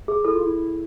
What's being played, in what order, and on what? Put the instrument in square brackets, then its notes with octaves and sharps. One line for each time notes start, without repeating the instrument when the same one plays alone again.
[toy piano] G#4
[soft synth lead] E4 [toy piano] A4
[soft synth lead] F4
E4